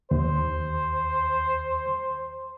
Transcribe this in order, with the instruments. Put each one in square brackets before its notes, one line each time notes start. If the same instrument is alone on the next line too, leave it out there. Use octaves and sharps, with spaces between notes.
[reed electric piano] D#2 [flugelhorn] C5